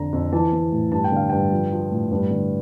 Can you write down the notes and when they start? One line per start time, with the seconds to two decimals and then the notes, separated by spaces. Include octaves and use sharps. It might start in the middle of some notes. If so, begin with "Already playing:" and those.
Already playing: F2 D3 A#5
0.13 F2
0.33 E3 A5
0.53 E3
0.72 A2
0.92 G2 A5
1.04 G5
1.12 D3 F5
1.30 G2 G5
1.52 F3
1.72 F3
1.91 A2
2.12 G2
2.30 D3